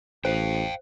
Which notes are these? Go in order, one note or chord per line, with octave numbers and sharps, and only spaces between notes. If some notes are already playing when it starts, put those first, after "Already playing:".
A1 C5 F5 G5